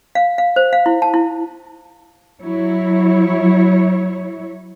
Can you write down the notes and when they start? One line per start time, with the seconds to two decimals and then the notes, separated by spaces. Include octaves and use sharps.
0.15 F5
0.38 F5
0.56 C5
0.73 F5
0.86 E4
1.02 A5
1.14 E4
2.42 F#3 E4 C#5